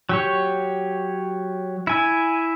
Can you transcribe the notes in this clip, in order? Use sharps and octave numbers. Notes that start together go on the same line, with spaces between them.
F#3 G4 C#5
E4 G#5